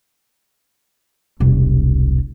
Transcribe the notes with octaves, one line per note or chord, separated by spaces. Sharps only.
E1 C2